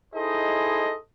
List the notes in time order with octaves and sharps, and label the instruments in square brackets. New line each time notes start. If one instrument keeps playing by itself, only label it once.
[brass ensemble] D#4 E4 G#4 A4 C5 D#5